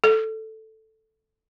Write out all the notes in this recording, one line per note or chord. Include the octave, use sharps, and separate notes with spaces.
A4